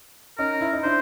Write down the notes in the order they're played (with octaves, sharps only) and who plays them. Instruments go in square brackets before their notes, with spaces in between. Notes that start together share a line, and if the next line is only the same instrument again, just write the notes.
[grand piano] C#4 D#4 [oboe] A#4
[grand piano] E4
D#4
[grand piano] D4 E4 [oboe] C5